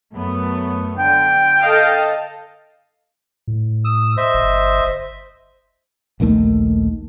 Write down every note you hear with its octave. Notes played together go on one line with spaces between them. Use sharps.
F#2 A3 B3
D3 G5
A4 D#5 F5
A2
D#6 E6
C5 D#5 E5
G1
A#1 D#2 D#3 A3